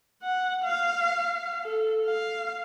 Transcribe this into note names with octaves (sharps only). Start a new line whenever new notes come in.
F#5
F5
A4
F5